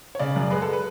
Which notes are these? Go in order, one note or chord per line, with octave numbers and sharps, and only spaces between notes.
C#5
C#3 D5
F#2
G#3 B4
A4
B4